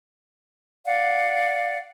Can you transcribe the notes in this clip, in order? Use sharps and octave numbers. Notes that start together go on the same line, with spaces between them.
D5 F5 F#5